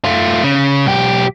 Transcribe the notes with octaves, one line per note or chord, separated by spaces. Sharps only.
A3 F4
C#3
B1 G4